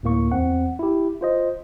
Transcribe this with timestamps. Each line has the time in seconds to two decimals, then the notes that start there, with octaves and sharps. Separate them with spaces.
0.03 D2 A2 A#3 C#6
0.32 E2 C4 F#5
0.79 E4 G4
1.21 F4 C5 D#5